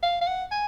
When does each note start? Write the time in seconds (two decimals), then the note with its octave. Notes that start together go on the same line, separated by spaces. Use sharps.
0.03 F5
0.21 F5
0.27 F#5
0.52 G#5